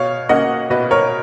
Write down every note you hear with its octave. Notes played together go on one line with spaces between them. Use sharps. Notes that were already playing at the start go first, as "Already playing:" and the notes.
Already playing: B2 C#5 F5
A#3 C#4 D#5 F#5
B2 B4 D#5
A#4 C#5